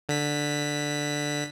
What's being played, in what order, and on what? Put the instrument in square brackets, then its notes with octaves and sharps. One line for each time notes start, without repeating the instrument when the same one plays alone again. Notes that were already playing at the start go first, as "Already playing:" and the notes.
[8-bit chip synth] D3 B6